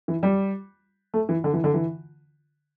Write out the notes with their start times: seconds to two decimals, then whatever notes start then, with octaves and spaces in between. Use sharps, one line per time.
0.08 E3
0.23 G3
1.14 A3
1.29 E3
1.44 D3
1.54 E3
1.64 D3
1.74 E3